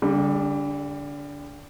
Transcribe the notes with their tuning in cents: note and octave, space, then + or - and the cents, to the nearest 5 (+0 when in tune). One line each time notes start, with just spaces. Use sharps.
D3 -25 G3 +25